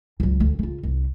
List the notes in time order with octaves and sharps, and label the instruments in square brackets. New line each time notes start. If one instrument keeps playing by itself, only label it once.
[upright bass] C#2 F#3
D2
C#3 F4
C2